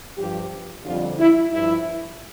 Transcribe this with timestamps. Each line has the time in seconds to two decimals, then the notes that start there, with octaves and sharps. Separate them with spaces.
0.17 G2 F3 G4
0.84 F2 D3 G3 F4
1.18 E4
1.51 G2 F3 E4